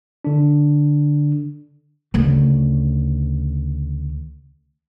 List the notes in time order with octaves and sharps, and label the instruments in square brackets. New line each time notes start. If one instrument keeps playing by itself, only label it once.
[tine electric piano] D3 D4
[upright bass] D2 C#3